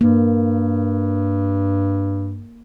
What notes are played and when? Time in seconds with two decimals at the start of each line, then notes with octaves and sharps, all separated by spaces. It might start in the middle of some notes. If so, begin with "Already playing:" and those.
0.01 G2 A#3